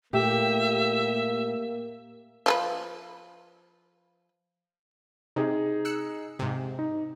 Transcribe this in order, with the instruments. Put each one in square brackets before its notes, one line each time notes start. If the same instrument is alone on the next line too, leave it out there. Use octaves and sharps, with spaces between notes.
[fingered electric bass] A#2 A3 [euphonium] A#3 [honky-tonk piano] G4 [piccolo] E5
[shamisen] F3 A4 B4
[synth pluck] C3 [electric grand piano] D#4 G#4
[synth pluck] E6 F#6 C#7
G#2 C3
[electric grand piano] D#4